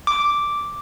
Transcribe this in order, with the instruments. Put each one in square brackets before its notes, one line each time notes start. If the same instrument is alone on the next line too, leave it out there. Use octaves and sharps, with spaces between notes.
[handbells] D6